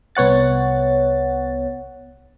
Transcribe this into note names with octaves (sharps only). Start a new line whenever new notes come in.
C2 B3 C#5 F#5 A6